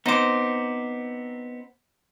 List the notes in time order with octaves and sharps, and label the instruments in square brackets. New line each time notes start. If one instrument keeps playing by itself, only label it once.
[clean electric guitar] B3 C4 C5 [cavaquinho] D#4 D6